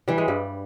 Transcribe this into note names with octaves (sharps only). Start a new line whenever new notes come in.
E3 G3
G#3
G2 G3